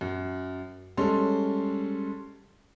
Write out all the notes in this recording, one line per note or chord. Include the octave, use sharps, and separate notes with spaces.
F#2
G3 G#3 C#4 A4 C6